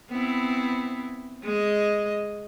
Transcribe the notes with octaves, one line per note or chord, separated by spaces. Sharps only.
B3 C4 E4
G#3 D#5